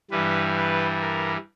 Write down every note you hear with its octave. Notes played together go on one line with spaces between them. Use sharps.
G2 E3 G3 B4
B4
A#4